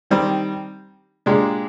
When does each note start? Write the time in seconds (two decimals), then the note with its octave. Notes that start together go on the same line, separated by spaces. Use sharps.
0.11 D#3 G3 C4
1.26 A#2 G#3 D4 G4